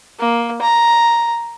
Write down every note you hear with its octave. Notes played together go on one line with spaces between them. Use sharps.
A#3
A#5